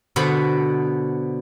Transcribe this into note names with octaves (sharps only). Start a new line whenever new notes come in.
B2 D3 B3 C5 F#5 B5